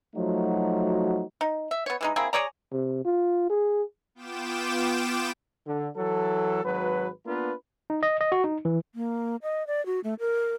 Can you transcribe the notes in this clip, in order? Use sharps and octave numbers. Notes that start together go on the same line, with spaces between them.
F3 F#3 A3 D#4 F#4
D#4
E5
B3 C#5
E3 G#3 D#4
A#3 C4 E4 G#4
G#4 C#5 D5 A#5
C3
F4
G#4
B3 F4 G5 D6 E7
D3
E3 F#3 A4
G#1 F#3 B4
A#3 B3 D4 F4 B4
D#4
D#5
D#5
F#4
D#4
E3
A#3
D#5
D5
F#4
A3
A#4